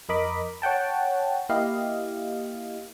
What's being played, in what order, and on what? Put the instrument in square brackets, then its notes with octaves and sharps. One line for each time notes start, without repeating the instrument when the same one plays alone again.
[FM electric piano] F2 A#4 D#5 B5 D6
C#5 F#5 G5 A5
A#3 E4 G4 D#5 F5